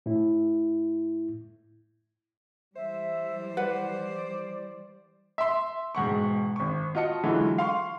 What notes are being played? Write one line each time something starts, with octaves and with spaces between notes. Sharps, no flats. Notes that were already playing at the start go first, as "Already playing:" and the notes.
A2 E4
E3 G3 C5 E5
B4 D5 F#5
E5 C6
E1 G#2 F#5 C#6
G#1 C#6
F4 F#4 D#5 A5 C#7
D3 E3 F#3 G#3 F4 F#4
F5 C6 C#6